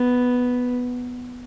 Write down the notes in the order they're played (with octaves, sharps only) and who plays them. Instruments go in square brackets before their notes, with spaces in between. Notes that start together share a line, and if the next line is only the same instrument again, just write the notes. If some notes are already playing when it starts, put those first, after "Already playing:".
Already playing: [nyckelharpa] B3